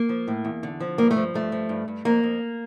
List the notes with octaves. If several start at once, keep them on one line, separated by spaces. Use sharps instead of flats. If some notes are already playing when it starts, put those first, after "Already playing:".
Already playing: A#3
F3
A2
E2
D3
F3
G2 A#3
A3
F3
G2 A3
F3
G2
G2
F2 A#3
F2